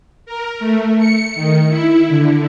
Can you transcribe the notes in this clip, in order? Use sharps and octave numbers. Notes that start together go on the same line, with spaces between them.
A#4
A3
C#7
D#3
E4
D3